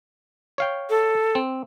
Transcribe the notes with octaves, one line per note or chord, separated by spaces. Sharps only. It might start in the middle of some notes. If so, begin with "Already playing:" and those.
C#5 F5 G5
A4
C4